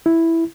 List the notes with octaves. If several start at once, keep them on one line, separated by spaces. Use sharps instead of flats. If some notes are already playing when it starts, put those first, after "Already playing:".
E4